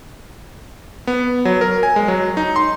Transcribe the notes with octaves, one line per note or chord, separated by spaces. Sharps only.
B3
F#3
A#4
G#5
G#3
F#3
D#4
C6